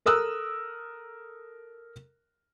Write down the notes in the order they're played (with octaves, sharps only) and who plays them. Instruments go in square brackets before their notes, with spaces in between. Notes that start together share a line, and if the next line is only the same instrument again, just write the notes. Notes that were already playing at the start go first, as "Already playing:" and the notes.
[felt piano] A4 A#4 D#6 E6 F#6